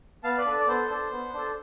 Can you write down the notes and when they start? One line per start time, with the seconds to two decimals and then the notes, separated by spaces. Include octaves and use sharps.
0.23 B3 F5 A5
0.38 B4 D5
0.46 D4 A4
0.60 D5
0.67 B3 A4 C5
0.90 D4 A4
1.12 B3
1.34 D4 A4